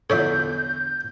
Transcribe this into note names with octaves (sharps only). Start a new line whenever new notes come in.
E2 D3 F3 A4 C#5 D5 E5 G6